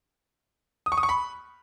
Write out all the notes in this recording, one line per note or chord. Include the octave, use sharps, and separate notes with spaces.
D#6
C#6
D#6
C#6
B5